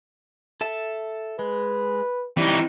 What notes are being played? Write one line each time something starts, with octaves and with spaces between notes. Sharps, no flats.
A4 E5 A5
G#3 B4
E3 G3 C4 D#4 E4